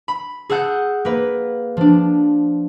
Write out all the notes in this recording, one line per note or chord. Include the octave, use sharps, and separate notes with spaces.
B5
G#4 A4 F#5 F#6 G6
A#3 B4
F3 D4